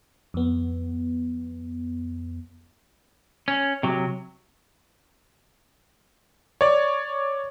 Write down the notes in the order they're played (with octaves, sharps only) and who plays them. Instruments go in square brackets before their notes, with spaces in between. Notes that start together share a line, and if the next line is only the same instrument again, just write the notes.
[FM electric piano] F2 B3
[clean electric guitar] C#4
C3 F#3
[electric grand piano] C#5 D5